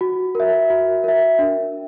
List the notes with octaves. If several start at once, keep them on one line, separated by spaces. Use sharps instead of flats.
F#4
A#4 E5
F#4
A#4 E5
D4